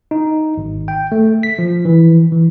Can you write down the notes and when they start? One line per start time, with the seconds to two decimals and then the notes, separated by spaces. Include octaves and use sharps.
0.11 D#4
0.57 G#1
0.88 G5
1.12 A3
1.43 B6
1.59 F3
1.85 E3
2.32 E3